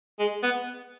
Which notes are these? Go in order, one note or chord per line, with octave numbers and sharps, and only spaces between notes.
G#3
B3